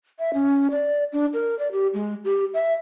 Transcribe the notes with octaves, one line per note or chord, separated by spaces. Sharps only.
E5
C#4
D5
D4
A#4
D5
G4
G#3
G4
E5